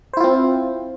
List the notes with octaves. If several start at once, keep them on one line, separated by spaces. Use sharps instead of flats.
C4 E4 F4 C5